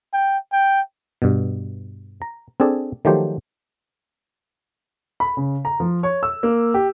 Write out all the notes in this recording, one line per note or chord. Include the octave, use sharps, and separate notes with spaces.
G5
G5
G2 B2
A#5
C4 D4 G#4 A4 D5
D#3 F3 F#3 A3 G4 C5
B5
C#3
A#5
F3
C#5
E6
A#3
G4